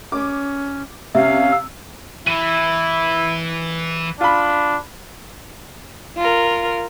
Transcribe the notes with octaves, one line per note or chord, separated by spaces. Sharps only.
C#4 D6
C3 C#4 E5 F5
E6
E3 E4 D#7
D4 F4 B5
F4 A#4